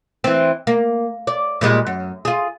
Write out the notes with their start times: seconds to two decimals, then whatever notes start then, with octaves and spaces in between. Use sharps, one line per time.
0.24 E3 C4
0.67 A#3
1.27 D5
1.61 A#2 G3 G#3
1.87 F#2
2.25 F4 G#4